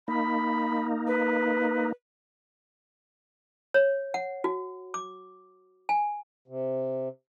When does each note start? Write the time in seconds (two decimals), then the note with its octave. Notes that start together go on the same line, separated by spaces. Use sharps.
0.08 A#3 D#4 B5
1.07 B4
3.74 C#5
4.14 F#5
4.44 F#4
4.94 D6
5.89 G#5
6.48 C3